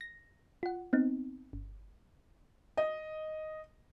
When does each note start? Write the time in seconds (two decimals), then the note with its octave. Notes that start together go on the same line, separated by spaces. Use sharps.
0.01 A#6
0.63 F4 F#5
0.93 B3 C4 D#4
1.53 G1
2.77 D#5